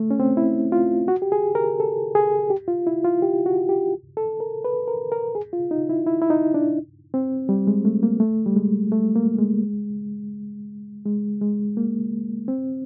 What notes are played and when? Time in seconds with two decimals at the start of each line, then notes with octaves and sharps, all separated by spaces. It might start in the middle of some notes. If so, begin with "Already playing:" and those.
Already playing: A3
0.11 C#4
0.20 C4
0.37 E4
0.72 F4
1.08 F#4
1.22 G4
1.32 G#4
1.55 A#4
1.80 A4
2.15 G#4
2.50 G4
2.68 F4
2.87 E4
3.05 F4
3.22 G4
3.46 F#4
3.69 G4
4.17 A4
4.40 A#4
4.65 B4
4.88 A#4
5.12 A#4
5.35 G#4
5.53 F4
5.71 D#4
5.89 E4
6.07 E4
6.22 E4
6.30 D#4
6.54 D4
7.14 C4
7.49 G3
7.67 G#3
7.85 A3
8.03 A#3
8.20 A3
8.46 G3
8.56 G#3
8.92 A3
9.15 A#3
9.39 G#3
11.05 G#3
11.41 G#3
11.77 A#3
12.48 C4